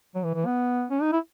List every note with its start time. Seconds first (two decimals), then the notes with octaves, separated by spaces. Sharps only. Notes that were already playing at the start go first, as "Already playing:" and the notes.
0.15 F#3
0.23 E3
0.34 E3
0.46 B3
0.90 C#4
1.01 D#4
1.12 E4